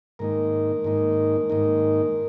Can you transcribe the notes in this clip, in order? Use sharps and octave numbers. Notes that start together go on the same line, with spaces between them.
G#2 D#3 A#3 D#4 A#4
G#2 D#3 A#3 D#4
G#2 D#3 A#3 D#4